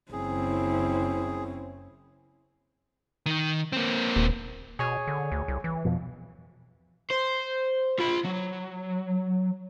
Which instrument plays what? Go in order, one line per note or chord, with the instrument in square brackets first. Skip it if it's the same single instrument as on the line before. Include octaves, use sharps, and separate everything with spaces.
[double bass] F#1 C#4 [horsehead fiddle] C4 E4 [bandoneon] G#4
[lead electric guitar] D#3
A#3 C4
[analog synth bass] D#1
[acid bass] B2 [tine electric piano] G#4 C#5 G#5
[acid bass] D3
D2
C2
E3
[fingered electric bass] F2 B2 F3
[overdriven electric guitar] C5
F4 B5
F#3